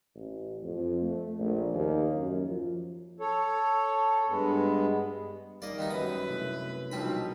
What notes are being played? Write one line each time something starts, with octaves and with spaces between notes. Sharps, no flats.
A1
F2
A3
A#1
D#2
F#2
F3
A4 C#5
G2 G#3 B3
D#2 G3 A#3 D#4 D5 D#5
D#3 B3 D#4 E5
F#2 B4 D#6
C3 A3 E4
B1 F3 G3 A#3 C4 D4 D#4 B5